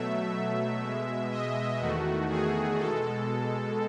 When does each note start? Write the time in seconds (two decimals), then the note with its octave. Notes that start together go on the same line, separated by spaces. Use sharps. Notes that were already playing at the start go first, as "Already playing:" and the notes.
Already playing: B2 F#3 A3 E5
0.82 B2 G#3
1.31 D#5
1.80 E2 D#3 A3 F#4
2.30 G#4
2.79 B2 G#3 A4